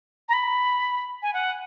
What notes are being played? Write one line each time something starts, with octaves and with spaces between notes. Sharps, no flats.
A#5
B5
G#5
F#5